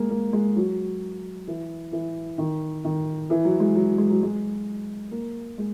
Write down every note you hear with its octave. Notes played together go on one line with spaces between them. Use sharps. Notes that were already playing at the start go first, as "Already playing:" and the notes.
Already playing: G#3 A#3
A#3
G#3
F#3
E3
E3
D#3
D#3
E3
F#3
G#3
F#3
G#3
F#3
G#3
A#3
G#3